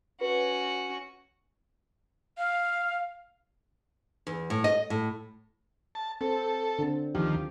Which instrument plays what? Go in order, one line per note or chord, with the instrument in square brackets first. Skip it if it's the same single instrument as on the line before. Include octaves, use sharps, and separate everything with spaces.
[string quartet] C#4 F#4 [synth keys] B4
[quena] F5
[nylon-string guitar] E2
A2
D#5
A2
[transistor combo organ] A5
[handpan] C4 [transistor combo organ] A4
[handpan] D3 C4
[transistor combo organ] D#2 F3 [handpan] G4